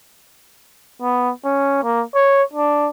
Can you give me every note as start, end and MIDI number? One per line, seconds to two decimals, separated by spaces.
1.02 1.31 59
1.45 1.81 61
1.83 2.02 58
2.15 2.43 73
2.53 2.89 62